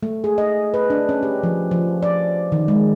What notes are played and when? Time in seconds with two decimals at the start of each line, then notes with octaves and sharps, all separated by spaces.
0.03 A3
0.24 G#4
0.38 D#5
0.74 B4
0.90 D4
1.09 C#4
1.23 G4
1.43 F3
1.71 F3
2.03 D5
2.52 D#3
2.68 G#3